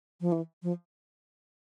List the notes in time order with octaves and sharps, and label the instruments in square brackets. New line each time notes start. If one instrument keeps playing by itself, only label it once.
[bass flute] F3
E3
F3